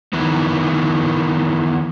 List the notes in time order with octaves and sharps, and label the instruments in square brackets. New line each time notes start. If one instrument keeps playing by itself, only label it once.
[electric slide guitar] D#3 E3 B3